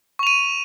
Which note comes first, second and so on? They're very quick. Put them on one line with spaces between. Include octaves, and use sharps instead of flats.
C#6 F7 D#7